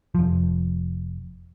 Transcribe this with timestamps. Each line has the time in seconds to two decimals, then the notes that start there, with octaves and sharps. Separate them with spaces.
0.15 F1 F3